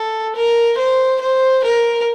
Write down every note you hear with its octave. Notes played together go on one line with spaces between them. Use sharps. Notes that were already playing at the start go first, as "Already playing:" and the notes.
Already playing: A4
A#4
C5
C5
A#4